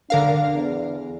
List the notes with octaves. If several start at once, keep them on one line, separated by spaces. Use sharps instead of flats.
D3 D4 A#4 F5
E2